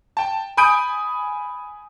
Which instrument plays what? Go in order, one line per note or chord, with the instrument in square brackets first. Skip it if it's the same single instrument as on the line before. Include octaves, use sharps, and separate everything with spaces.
[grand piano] G5 A5
G#5 B5 D#6 G6 D7